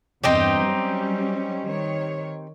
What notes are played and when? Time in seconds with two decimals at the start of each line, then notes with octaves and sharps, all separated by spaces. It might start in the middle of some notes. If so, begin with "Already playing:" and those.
0.24 E2 G2 C4 D#4 G4
0.64 F#3 G3 C#4
1.68 D#3 C#5